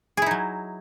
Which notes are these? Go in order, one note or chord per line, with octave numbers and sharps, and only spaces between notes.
F#3 D#4 E4 G#4